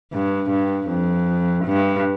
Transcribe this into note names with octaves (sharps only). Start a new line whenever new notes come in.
G2
G2
F2
G2